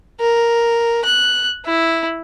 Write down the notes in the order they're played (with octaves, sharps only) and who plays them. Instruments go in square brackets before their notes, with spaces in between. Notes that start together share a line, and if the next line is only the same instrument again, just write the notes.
[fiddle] A#4
F#6
E4